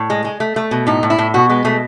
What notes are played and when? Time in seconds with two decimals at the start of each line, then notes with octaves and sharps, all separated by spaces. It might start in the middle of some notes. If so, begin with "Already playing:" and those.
Already playing: A2
0.10 G#3
0.25 G#3
0.40 A3
0.56 A3
0.71 B2
0.87 A2 D#4
1.03 A2
1.10 E4
1.19 A2
1.34 B2 F#4
1.50 G#3 B3
1.65 B2 A3